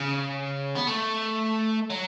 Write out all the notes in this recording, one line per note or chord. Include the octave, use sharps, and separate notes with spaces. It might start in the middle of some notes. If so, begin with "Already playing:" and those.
Already playing: C#3
B3
A3
F#3